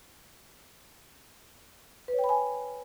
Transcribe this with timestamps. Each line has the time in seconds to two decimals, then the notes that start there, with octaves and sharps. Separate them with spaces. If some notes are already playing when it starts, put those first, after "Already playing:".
2.08 B4
2.13 C#5
2.19 G5
2.24 B5
2.29 G#5